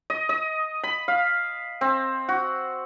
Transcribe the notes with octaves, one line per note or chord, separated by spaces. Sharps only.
D#5
D#5
B5
F5
C4
F#4